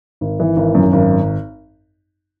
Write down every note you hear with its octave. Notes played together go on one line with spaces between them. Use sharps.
G#1
E3
G#1
F#2
G#1